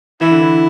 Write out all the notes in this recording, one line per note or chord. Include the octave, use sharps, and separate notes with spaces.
E3 E4
D3
E3